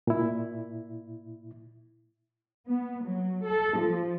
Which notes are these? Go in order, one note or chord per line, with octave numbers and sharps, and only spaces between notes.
A#2 E4
B3
F#3
A4
F3